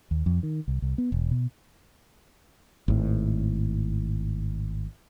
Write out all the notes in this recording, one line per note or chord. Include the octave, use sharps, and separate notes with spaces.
D#2
F2
D#3
C2
C2
B3
E1
B2
G#1 A2